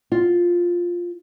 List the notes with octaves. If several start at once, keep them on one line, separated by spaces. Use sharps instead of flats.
F4